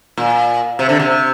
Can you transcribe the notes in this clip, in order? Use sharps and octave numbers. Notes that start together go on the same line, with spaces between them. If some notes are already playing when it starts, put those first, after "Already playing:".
A#2
C3
D3
C3